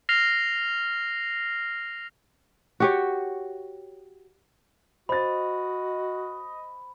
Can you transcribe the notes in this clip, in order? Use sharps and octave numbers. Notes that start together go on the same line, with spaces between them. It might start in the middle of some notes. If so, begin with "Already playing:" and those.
F6 A#6 C7 F7
F#4 G4 C#5
F#4 C5 D#5 B5 A6